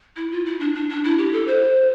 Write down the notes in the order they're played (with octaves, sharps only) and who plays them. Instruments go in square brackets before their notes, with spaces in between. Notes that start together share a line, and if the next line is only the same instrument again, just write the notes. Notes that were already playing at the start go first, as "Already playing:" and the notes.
[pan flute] E4
F4
E4
D4
D4
D4
E4
G4
A4
C5